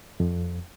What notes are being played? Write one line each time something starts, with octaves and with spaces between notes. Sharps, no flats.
F2